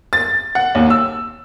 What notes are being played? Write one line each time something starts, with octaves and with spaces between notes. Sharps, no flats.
A6
F#5
D#2
E6